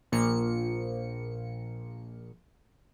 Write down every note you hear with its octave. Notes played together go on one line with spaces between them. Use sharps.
A#1 F3 A#3 C#7